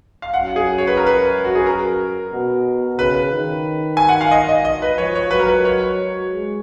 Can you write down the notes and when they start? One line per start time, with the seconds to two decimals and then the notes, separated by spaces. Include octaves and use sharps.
0.22 F5
0.34 F#2 F#5
0.56 G#4
0.78 C#5
0.87 B4
0.97 A#4
1.06 B4
1.44 F#4
1.55 G#4
1.66 A#4
2.33 B2
2.98 C#3 B4
3.32 D#3
3.97 G#5
4.09 F#5
4.21 F5
4.31 D#5
4.48 D#5
4.65 D#5
4.82 B4
4.98 F3 C#5
5.15 C#5
5.31 F#3 B4
5.39 A#4
5.48 B4
5.65 C#5
6.31 G#3